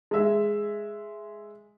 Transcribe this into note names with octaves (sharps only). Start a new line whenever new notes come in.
G#3 E5